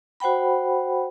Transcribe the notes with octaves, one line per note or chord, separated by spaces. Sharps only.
F#4 C5 F#5 G5 B5